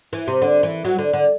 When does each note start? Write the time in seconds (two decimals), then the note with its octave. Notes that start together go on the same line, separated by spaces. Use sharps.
0.13 E3
0.27 C3
0.42 D3
0.63 E3
0.84 F#3
0.98 D3
1.13 D3